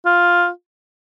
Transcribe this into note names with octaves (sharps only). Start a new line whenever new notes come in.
F4